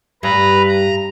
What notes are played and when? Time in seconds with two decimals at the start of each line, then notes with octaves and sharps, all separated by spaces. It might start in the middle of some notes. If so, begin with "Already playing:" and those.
0.23 G2 B4 A#5
0.69 A#5